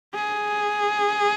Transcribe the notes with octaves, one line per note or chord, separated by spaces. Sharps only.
G#4